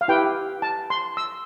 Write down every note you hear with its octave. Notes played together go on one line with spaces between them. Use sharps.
F5
E4 G4 B4 G5
A5
C6
E6